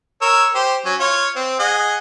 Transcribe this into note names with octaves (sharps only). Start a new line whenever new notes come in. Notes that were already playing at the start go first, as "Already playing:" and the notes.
A#4 C#5 E6
G4 C5
F#3 C#4
F4 C#5
C4
G#4 D#5 F#5